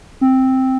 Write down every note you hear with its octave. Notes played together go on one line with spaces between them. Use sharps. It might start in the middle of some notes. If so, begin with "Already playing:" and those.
C4